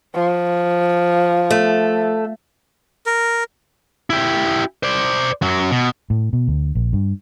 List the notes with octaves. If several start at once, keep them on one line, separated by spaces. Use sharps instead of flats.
F3
A3
A#4
E4 G4
C5 D5
F#2 F#3
B2
A2
B2
D2
A#1
G2